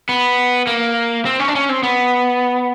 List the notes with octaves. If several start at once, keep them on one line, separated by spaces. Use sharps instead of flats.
B3
A#3
C4
C#4
D4
C#4
C4
B3